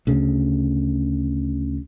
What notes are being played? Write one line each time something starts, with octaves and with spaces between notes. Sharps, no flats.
D2 C#3